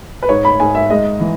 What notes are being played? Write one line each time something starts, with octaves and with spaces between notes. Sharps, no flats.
B4
G#2 C#5
B5
G#2 G#5
E5
G#3 D#5
E3